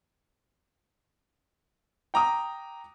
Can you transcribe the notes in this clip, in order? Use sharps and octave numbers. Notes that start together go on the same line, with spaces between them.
G5 A#5 D6 D#6